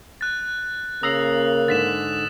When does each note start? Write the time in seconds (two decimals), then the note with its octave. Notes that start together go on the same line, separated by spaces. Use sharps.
0.21 F#6 A6
1.03 C#3 A#3 A#5 D#6 E6 A#6 C7
1.68 G#2 D3 A6 B6 E7